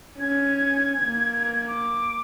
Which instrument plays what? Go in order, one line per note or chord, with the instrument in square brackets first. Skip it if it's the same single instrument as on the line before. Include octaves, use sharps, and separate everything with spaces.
[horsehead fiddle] C#4 [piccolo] G#6
[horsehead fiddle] A#3
[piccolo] D6